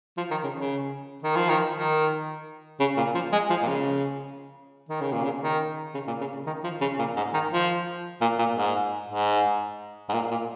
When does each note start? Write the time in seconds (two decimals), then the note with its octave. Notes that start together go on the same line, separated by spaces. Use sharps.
0.17 F3
0.31 D#3
0.43 C#3
0.57 C#3
1.23 D#3
1.36 F3
1.49 D#3
1.75 D#3
2.80 C#3
2.97 A#2
3.15 F3
3.32 G#3
3.50 F3
3.62 A#2
3.67 C#3
4.89 D#3
5.01 C#3
5.12 A#2
5.24 C#3
5.42 D#3
5.94 C#3
6.07 A#2
6.20 C#3
6.46 D#3
6.64 F3
6.81 C#3
6.99 A#2
7.16 G#2
7.34 D#3
7.51 F3
8.21 A#2
8.39 A#2
8.56 G#2
9.08 G#2
10.09 G#2
10.13 A#2
10.31 A#2